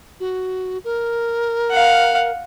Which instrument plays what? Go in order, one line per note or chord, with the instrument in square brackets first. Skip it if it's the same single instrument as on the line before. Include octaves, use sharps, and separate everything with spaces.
[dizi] F#4
A#4
[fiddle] F5 F#5